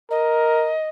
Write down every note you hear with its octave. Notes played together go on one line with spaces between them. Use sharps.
A#4 D#5